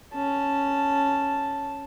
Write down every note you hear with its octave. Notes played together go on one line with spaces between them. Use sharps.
C#4 A5